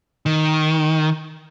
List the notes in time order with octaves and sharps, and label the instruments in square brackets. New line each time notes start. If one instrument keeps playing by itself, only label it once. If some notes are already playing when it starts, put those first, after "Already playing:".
[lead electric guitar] D#3